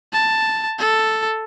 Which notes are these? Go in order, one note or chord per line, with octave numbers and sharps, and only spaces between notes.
A5
A4